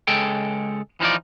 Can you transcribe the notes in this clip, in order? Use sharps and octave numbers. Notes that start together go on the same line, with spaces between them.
C#2 G#3 A4 G5
E3 F3 D#4 F4 D5